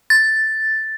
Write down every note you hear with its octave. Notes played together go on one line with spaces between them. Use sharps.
A6